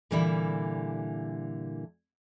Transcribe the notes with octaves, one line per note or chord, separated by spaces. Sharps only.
A#2 D3 E3 G3 E4